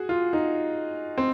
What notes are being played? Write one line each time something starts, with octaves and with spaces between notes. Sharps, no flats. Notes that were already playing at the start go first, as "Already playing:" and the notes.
Already playing: F#4 G#4
F4
D#4
C4